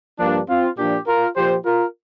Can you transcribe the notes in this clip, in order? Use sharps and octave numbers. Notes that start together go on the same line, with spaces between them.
G2 F3 A#3 D4
C4 F4
A#2 F3 D4 G4
F4 A#4
A#2 F3 G4 C5
F4 A#4